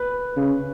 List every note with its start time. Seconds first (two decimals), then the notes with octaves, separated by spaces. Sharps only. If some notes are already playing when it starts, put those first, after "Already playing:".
Already playing: B4
0.36 C#3